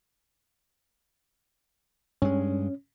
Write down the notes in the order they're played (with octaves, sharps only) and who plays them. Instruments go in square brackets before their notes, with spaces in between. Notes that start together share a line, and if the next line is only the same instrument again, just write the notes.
[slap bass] G2 G#3 [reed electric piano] C#4